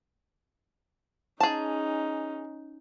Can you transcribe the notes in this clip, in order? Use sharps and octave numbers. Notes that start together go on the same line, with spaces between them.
C#4 D#4 G#4 A5